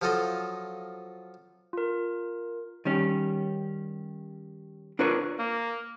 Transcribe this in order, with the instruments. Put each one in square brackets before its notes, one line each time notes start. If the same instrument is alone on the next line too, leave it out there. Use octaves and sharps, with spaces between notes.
[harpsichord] F3 F#3 F4 A4 D#5
[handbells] F4 A#4
[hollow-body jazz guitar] D#3 G3 C#4
D4 F4 A#4 B4 C#5
[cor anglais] A#3